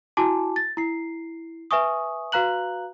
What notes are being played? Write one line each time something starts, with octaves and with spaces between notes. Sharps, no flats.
E4 F#4 G#5 A5 D6
A6
E4 C7
B4 E5 G#5 C#6 D#6
F#4 B4 F5 A#5 F#6 F#7